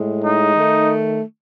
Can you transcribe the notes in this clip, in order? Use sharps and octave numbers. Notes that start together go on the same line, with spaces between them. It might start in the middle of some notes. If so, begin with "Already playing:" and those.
Already playing: A2 G#3
D#4
D#3 A3